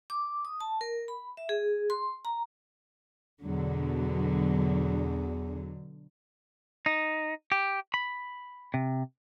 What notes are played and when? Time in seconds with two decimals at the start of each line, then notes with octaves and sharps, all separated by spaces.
0.10 D6
0.45 D#6
0.61 A5
0.81 A#4
1.08 B5
1.37 E5
1.49 G#4
1.90 C6
2.25 A#5
3.43 E2 B2 D3 F#3
6.86 D#4
7.52 G4
7.94 B5
8.74 C3